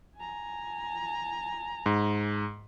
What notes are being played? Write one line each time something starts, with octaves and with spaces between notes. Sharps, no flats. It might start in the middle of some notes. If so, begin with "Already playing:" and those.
G#5 A#5
G#2